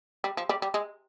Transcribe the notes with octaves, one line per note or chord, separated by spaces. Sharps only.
G3
F3
G3
G3
G#3